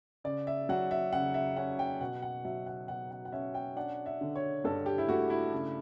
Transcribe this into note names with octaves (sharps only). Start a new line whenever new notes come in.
C#3 D5
E5
F#3 F#5
E5
C#3 F#5
E5
C#4 F#5
G5
B2 F#5
F#5
F#3 E5
F#5
B2 F#5
F#5
F#5
C#4 E5
G5
D4 F#5
E5
D3
C#5
G2 A4
G4
E4
A3 F#4
E4
C#3